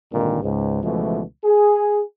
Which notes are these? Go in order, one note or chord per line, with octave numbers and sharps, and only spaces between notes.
G#1 G2 A#2 D3 D#3
C#2 G#2
C#2 B2 E3 F3 G#3 A3
G#4